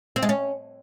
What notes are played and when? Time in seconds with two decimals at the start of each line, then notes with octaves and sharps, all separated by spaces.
0.16 C4
0.23 G#3
0.29 C#4